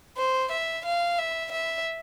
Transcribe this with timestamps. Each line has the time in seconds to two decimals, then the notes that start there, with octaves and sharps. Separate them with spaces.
0.17 C5
0.51 E5
0.85 F5
1.19 E5
1.51 E5